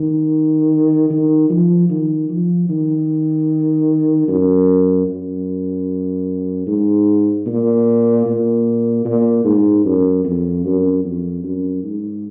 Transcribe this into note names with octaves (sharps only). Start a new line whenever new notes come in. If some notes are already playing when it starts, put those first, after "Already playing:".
Already playing: D#3
D#3
F3
D#3
F3
D#3
F#2
F#2
G#2
A#2
A#2
A#2
G#2
F#2
F2
F#2
F2
F#2
G#2